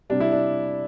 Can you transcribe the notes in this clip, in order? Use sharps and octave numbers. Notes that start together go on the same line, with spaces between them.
C3 G3 D4
E4
D4